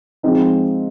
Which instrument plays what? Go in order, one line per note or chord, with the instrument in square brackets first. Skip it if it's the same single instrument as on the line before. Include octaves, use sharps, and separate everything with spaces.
[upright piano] F3 G#3 C4 D#4